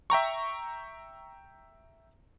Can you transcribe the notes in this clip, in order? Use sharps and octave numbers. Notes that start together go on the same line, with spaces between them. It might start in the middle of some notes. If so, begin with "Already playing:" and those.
E5 G5 A#5 C#6